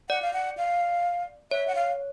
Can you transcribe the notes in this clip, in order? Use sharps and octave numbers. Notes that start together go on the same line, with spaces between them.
D5 F#5
F5
F#5
F5
C#5 E5
F#5
F5